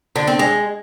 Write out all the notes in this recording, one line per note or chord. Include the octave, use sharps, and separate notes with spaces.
D3
C4
G#3